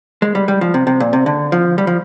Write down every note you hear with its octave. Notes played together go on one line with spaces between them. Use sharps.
G#3
G3
G3
F3
C3
C3
A#2
C3
D3
F3
G3
F3